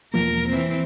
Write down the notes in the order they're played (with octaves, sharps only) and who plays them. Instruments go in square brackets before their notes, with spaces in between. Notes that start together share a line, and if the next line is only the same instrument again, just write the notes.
[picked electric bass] E1 F3 A#3 [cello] A#4
[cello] E3 C4